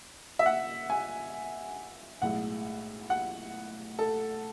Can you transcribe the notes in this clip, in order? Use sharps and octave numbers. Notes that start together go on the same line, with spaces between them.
E5
F#5
G#5
B1 A2 G#3 F#5
F#5
A4